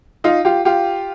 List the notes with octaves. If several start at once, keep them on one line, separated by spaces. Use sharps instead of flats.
D#4 F4
F4 G4
F4 G4